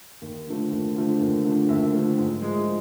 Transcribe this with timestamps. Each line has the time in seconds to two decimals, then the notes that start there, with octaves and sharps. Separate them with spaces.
0.22 D#2
0.47 D3 F3 A3
0.71 D#2
0.96 D3 F3 A3
1.20 D#2
1.44 D3 F3 A3
1.69 D#2 E5
1.93 D3 F3 A3
2.18 G#2
2.42 F3 G#3